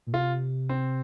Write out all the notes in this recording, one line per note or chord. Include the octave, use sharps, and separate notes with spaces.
A#2
C3 F4
C4